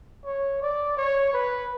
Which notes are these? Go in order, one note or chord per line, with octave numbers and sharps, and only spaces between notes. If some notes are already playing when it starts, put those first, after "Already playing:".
C#5
D5
C#5
B4